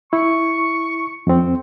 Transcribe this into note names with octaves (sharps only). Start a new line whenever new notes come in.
E4 C#6
F2 C4